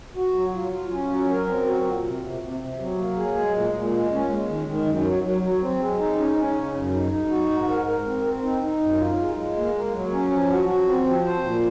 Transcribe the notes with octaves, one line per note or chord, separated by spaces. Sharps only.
F#4
F#3
F4
F4
C#4
F#3
A#4
C4
F#4
A#2
C3
C3
C3
C3
F#3
A#3
G#4
G#3
A#2
A#2
G#3
C#4
G#3
D#3
D#3
F#2
F#3
F#3
F#3
C4
G#3
D#4
C#4
C#4
C#3
F#2
D#4
D#4
F#4
G#2
A#4
A#4
C4
C4
D#4
D#4
F#2
F4
G#3
G#3
A#3
A#3
F#3
C#4
F3
F#4
F#4
C4
F3
C5
A#2